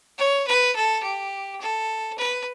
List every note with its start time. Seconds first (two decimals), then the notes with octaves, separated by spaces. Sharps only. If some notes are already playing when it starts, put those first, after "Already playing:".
0.18 C#5
0.47 B4
0.76 A4
1.03 G4
1.61 A4
2.18 B4